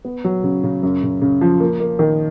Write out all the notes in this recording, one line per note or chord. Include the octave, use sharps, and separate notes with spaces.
B3
F#3
C#3
C#3
F#2
C#3
C#3
F3
A#3
A#3
D#3